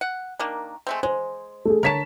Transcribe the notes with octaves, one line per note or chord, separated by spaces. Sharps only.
F#5
D#3 A#3 D4
G#3 A3 C4
G#3 C5
A3 G#4
D3 A#4 C#5 A5 B6 E7